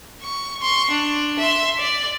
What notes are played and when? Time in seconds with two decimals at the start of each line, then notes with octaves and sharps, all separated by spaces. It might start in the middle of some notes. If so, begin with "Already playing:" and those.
0.22 C#6
0.62 C6 C#6
0.90 D4
1.39 E5 C6
1.79 D5